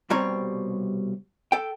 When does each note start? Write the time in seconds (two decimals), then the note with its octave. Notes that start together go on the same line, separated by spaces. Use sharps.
0.10 C2 B2 G3 C4 C#5 A#5
1.52 A4 G5